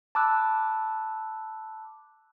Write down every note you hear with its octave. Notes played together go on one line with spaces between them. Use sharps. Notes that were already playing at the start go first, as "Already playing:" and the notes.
A5 B5 D6 E6 F#6